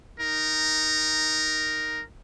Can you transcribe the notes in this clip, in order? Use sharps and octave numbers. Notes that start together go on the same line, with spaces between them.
D#4 A#4